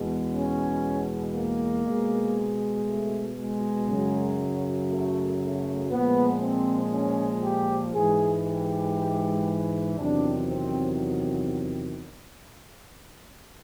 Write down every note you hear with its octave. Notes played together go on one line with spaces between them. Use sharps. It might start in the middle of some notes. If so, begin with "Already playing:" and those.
Already playing: E2 B2 G#3
C#4
A#3
B2 G#3
A3
G#3
F#2 C#3 F#3
A3
A3
A#2 F3 G#3 B3
C4
C#4
G4
G#2 E3 G#3 G#4
G4
E2 C3 D#3 F#3 D4
C4